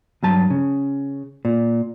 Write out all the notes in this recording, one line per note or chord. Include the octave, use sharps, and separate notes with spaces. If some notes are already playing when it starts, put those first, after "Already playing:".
G2 F#3 A5
C#3
A#2